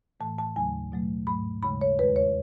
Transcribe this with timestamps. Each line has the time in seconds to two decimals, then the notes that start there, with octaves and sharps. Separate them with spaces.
0.20 A2 E3 A3 A5
0.38 A5
0.56 D#2 C#3 F#3 A3 G#5
0.92 B2 F#3 A3
1.27 G#2 F#3 A3 B5
1.63 D#2 C#3 G#3 B5
1.81 C#5
1.99 E2 D#3 G#3 B4
2.16 C#5